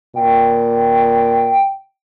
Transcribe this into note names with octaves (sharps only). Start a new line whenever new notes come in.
A#2 G5